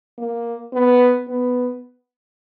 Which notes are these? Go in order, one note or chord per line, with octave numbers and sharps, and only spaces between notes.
A#3
B3
B3